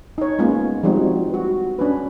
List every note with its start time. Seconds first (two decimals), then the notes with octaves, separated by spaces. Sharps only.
0.18 D#4 C#5
0.39 G#3 A#3 B3 C#4 F4
0.83 F3 G3 G#3 C4 D#4 F#4
1.30 F#4 B4
1.79 C#4 D4 B4